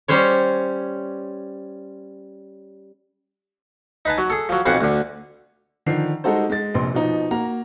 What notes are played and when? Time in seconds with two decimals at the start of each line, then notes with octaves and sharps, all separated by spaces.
0.08 G3 C#4 C5 C#5
4.05 D#4 B4 G#5 A5
4.18 F#3
4.30 G#4 A4
4.49 F3 F#3
4.66 B1 F2 C5 F#5 G#5
4.81 D2 D3
5.86 D3 D#3 F3 C7
6.24 G3 G#3 D#4 F#4 A4 C5
6.50 G#3 A6
6.74 F1 A#1 C6
6.94 B2 F3 D#4
7.31 A#3 F#4 A#5